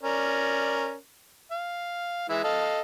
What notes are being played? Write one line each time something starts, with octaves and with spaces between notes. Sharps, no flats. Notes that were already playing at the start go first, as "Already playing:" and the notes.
C#4 A#4 D5
F5
E3 G#3 E4
A4 D#5 F5